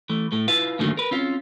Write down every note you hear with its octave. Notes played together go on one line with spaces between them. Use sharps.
E3 A3
A2 A3
E4 F4 B4 F5
G#2 D3 D#3 F#3 A3 A#3
A#4 B4
C4 C#4 F4